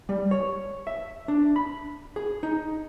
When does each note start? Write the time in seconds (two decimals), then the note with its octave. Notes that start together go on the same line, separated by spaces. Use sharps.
0.09 G3
0.31 C#5
0.87 E5
1.28 D4
1.56 B5
2.16 G#4
2.43 D#4